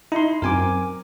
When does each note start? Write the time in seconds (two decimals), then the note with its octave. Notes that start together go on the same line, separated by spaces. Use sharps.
0.12 D#4 E4 C6
0.42 F#2 C4 A#4 G#5 D6